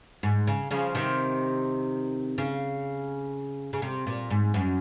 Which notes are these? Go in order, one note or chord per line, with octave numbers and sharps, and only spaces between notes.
G#2
C#3
C#3 F3
C3 D#3
C#3
C#3
C3
A#2
G#2
F#2